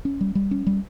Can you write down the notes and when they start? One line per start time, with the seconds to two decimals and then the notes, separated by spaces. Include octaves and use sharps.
0.05 C#4
0.21 G3
0.35 G3
0.51 C#4
0.67 G3